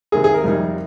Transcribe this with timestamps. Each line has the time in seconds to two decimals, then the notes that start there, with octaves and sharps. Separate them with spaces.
0.12 C3 D#3 A#3 G#4
0.24 G#4
0.34 A#4
0.44 F2 C3 G3 A#3 D#4